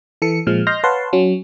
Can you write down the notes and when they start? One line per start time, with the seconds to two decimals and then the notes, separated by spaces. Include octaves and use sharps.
0.22 E3 A4 C#7
0.47 A#2 F3 G#3 F6
0.67 D#5 C6 F6 G6 A#6
0.84 B4 C#5 F5 F#5 A5 C6
1.13 F#3 C#4